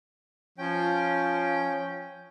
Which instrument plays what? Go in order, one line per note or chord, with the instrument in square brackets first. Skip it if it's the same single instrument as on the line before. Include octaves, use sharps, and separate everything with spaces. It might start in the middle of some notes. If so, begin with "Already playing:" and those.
[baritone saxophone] F3 [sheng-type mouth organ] C#4 G5